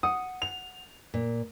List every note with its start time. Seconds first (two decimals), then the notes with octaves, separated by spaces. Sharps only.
0.03 F#5 D#6
0.42 F7
1.14 A#2